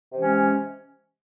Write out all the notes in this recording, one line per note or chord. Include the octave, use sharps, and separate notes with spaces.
C3 E3 G#3 C#4